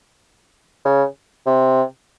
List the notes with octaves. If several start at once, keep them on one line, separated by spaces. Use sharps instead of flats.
C#3
C3